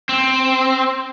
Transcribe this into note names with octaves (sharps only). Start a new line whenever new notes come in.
C4